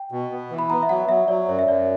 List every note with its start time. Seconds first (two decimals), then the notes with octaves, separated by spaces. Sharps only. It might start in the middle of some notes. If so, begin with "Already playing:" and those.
Already playing: G5
0.12 B2
0.32 B3
0.50 E3
0.59 B5
0.70 B3 A#5
0.83 E5
0.89 F#3 F#5
1.09 F#3 E5
1.28 F#3 D5
1.48 F#2 C#5
1.59 E5
1.68 F#2 D5